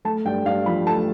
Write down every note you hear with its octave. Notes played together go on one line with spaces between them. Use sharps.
A3 A5
G2 G5
G2 F5
F3 B5
A3 A5